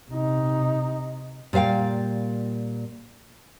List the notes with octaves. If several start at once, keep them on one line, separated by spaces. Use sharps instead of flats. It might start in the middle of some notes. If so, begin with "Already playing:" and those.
C3 D#4
A#2 G3 C5 F5 G5